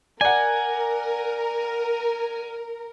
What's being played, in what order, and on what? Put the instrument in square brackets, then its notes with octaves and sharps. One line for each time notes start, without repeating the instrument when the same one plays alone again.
[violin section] A#4 [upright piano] D5 F#5 [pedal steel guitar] G#5